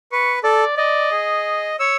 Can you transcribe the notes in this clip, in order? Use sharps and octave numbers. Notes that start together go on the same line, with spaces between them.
B4 C#6
A4 D5
D5 D#5
G#4
C#5 E6